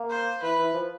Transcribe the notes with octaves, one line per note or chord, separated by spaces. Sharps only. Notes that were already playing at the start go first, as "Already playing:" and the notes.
Already playing: A#3
C5
E3 B4
E3
F3